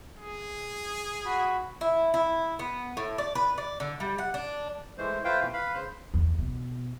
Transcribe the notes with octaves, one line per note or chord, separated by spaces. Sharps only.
G#4
F#4 B5
E4
E4
B3
A2
D5
B4
D5
D3
G3
F#5
D4
E3 G#3 A3 C5
A3 F4 B4 C5 F5 G5
F2 B2 E3 B4
B4 F5 B5
C#3 C5 C6 G6
E2
B2